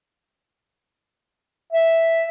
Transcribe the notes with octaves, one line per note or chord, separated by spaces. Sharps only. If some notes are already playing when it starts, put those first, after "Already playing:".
E5